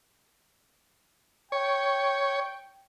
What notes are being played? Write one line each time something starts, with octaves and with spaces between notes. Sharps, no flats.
C#5 G5